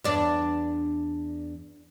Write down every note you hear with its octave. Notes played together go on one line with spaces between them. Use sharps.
E2 D4